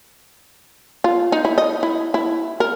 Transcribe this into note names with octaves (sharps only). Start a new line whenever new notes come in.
F4
D#4
E4
D#5
E4
E4
A#4